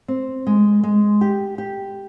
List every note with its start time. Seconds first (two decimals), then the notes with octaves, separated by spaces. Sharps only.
0.08 C4
0.47 G#3
0.84 G#3
1.21 G4
1.58 G4